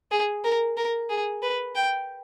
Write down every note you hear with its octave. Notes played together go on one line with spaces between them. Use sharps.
G#4
A#4
A#4
G#4
B4
G5